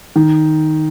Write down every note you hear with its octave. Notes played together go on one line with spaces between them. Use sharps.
D#3